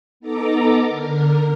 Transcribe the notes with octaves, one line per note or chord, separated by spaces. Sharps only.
B3 D#4 A4 A#5 D6
D3 A#4